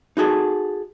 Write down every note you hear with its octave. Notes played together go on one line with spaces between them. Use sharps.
D#4 F#4 G#4 A4